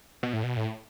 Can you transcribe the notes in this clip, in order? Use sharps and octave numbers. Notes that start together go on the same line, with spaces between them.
B2
A2
B2
A2